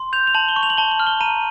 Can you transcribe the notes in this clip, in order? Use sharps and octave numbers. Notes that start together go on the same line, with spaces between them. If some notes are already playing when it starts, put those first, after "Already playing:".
Already playing: C6
G6 F7
F7
A5 F#7
G7
C#6
F7
F#7
A5 G7
F#7
F6
G7
A#5 D#7